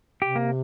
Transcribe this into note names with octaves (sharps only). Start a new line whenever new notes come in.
C3 G4
A#3